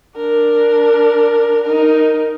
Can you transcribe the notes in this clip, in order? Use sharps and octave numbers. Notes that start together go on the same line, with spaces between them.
D4 A#4
D#4 A#4